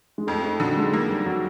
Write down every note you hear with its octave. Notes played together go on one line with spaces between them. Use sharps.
G#3
F2 A3
A3
D3 F#3
G#3
G#3 A#3
G3
F#3